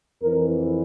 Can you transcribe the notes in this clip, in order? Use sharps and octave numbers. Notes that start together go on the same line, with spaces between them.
F2 E3 A#4